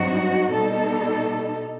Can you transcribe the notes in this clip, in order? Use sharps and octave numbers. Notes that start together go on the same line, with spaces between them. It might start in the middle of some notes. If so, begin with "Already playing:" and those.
Already playing: G2 F#3 C4 D#4 F#4
B2 G3 D#4 A4